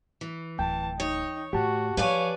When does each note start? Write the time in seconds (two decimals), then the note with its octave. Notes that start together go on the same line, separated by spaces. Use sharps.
0.21 E3
0.59 D1 G5 A5
1.00 D#4 C#5
1.53 A2 F#4 G4 A5
1.97 F3 B4 C#5 D5 F5 G#5